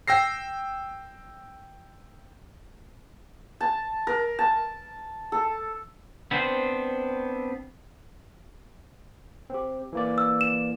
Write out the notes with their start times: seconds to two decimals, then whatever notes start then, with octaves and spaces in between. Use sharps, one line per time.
0.08 G5 E6 A#6 C7
3.60 A5
4.07 A#4
4.39 A5
5.32 A4
6.31 B3 C4 D4 C5
9.50 C4 G4
9.93 E3 A#3 D5
10.18 E6
10.41 E7